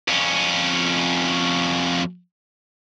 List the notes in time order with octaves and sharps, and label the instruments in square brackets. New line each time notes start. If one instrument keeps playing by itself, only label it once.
[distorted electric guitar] F2 C#4